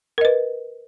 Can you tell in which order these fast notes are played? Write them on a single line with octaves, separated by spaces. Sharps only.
A#4 D#5 B4